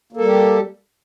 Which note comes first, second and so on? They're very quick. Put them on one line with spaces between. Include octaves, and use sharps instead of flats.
A#3 A4 G3 G4